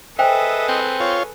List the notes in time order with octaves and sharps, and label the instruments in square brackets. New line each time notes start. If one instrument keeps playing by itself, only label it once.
[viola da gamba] G#4 A4 B4 [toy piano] C5 G5 G#5 [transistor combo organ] D#5 [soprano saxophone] E5
[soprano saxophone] C4
[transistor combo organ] F4 C#5